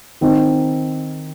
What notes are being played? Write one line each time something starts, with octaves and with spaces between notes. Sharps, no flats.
D#3 C4 D#4